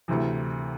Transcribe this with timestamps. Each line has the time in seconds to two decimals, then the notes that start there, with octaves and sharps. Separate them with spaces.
0.08 D2 C3 E3